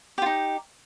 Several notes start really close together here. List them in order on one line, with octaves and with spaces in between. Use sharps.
G4 F4 D#4